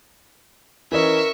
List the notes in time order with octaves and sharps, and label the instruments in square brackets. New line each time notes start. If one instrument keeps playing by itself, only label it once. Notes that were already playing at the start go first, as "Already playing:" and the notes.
[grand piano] E3 C#4 D#5 [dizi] A#4 [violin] E5 C#6